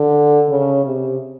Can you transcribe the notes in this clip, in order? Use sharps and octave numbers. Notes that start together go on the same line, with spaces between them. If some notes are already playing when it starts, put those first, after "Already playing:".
Already playing: D3
C#3
C3